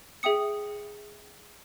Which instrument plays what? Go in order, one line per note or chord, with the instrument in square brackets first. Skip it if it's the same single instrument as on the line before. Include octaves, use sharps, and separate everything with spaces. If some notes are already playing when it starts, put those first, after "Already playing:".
[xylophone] G#4 E5 G5 D#6 C#7